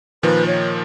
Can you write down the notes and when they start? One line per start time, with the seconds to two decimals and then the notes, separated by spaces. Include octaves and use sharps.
0.23 A#2 D#3 F3 B4
0.47 C#5